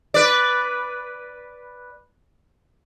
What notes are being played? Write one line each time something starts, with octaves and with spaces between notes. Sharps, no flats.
B4 D5